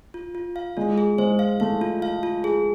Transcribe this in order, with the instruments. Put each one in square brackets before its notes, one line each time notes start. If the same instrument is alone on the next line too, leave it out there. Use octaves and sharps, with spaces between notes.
[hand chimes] F4
F4
F5
[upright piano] G#3 [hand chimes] F4
[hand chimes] G#4
[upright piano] G#3 [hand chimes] C5
[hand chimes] F5
[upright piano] A3 [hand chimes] F5
[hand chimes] F4
F5
F4
G#4